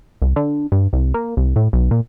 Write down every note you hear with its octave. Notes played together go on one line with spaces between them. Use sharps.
C2
D3
G2
C2
A#3
C2
A2
B1
A#2